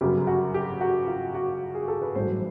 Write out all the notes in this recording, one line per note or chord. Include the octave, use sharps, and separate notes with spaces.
G1 F#2 C#3 F#3 G4
F#4
G4
F#4
F4
F#4
G#4
A4
B4
A1 G2 D#3 F#3 C5